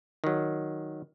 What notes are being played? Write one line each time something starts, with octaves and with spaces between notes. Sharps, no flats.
D#3 F#3